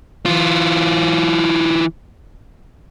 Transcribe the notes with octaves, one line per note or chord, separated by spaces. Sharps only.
E3 F4